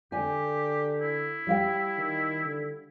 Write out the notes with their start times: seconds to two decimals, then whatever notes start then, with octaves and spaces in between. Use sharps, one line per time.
0.12 D3 G4 D5 G#5
1.01 E4
1.47 G3 F5 G5
1.98 D#3
2.44 D3